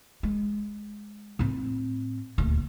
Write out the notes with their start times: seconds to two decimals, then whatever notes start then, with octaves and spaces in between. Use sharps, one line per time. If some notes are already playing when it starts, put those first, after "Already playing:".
0.23 G#3
1.39 A2 C4
2.38 D#1 D2